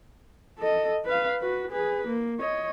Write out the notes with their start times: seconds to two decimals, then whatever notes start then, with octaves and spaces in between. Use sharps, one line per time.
0.59 A4 D#5
1.05 B4 F5
1.41 F#4 B4
1.71 G#4 B4
2.07 A#3
2.40 C#5 D#5